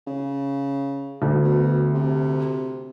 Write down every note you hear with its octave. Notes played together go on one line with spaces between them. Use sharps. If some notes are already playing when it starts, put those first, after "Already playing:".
C#3
D2
B2
C3